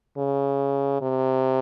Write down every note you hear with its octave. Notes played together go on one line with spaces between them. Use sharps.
C#3
C3